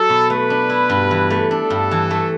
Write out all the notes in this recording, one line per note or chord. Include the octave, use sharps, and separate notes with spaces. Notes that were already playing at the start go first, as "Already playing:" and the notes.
Already playing: F#3 A4
B2
A3 B4
D4
E4
G2
E3
A3
D4 A4
G2
E3
A3